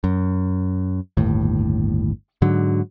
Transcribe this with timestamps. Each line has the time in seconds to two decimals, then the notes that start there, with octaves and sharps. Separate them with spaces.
0.04 F#2
1.17 G1 D#2 A2
2.42 G#2 D3 F#3